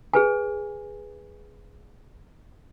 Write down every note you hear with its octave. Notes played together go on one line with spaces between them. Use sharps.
G#4 B4 G#5